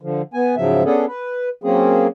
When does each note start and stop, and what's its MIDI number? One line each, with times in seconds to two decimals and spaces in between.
0.01 0.22 50
0.01 0.22 53
0.34 0.55 59
0.34 0.55 80
0.57 0.83 44
0.57 0.83 49
0.57 0.83 53
0.57 0.83 54
0.57 0.83 76
0.85 1.05 59
0.85 1.05 61
0.85 1.05 62
0.85 1.05 68
0.85 1.05 69
1.08 1.49 71
1.64 2.07 54
1.64 2.07 58
1.64 2.07 60
1.64 2.07 61
1.64 2.07 68